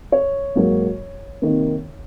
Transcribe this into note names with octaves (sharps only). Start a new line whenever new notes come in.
C#5
G#2 F#3 A#3
C3 D#3 A#3